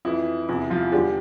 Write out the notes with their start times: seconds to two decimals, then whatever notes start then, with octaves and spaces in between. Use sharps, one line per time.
0.05 F2 E3 E4
0.48 E2 C3 F3 E4
0.70 F3 F4
0.92 E2 D3 F3 G3 G4